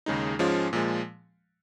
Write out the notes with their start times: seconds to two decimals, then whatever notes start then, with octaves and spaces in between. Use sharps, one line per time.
0.06 D#2 C#3 G#3 D#4
0.39 G#2 F3 G#3 C#4 F4
0.73 A#2 F3 G#3